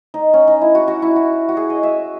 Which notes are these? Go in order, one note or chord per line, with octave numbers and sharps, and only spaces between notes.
D#4
C#4
D#4
E4
F#4
F#4
E4
F#4
F#4
G#4
D#5
E5